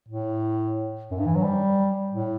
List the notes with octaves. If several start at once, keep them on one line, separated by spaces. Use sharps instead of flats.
A2
F#2
G2
E3
F#3
G3
A2